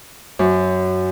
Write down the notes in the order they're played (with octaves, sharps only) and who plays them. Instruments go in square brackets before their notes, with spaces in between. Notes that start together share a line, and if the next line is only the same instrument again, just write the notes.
[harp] F#2